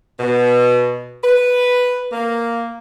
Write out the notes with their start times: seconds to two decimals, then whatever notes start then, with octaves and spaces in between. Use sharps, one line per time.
0.19 B2
1.24 B4
2.12 A#3